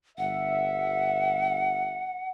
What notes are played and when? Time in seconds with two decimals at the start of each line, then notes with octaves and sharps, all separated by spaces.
0.18 G1 E5 F#5